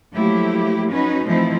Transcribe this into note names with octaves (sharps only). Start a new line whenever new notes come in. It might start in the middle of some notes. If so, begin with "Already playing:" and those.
F3 F#3 A3 A#3 E4 G4
C#4 D#4 F#4 B4
E3 F3 A3 C4 D#4 E4